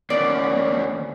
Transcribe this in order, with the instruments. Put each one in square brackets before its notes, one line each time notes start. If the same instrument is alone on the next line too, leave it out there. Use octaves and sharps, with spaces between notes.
[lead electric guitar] D2 A#3 [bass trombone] C#4 [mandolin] D5